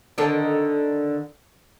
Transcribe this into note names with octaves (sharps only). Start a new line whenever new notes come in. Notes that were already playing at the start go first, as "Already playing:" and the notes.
D3 D#3 D4